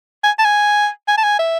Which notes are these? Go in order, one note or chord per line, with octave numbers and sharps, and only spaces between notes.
G#5
A5
G#5
G#5
A5
G#5
E5